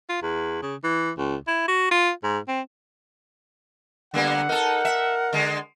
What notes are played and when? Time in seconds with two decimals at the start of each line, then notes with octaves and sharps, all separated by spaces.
0.09 F4
0.22 E2
0.62 C#3
0.83 E3
1.17 C#2
1.48 E4
1.68 F#4
1.91 F4
2.23 G#2
2.48 C4
4.14 D3 G3 A#3 B3 F#5
4.49 D#4 A4 A#4
4.85 E5
5.33 D3 G#3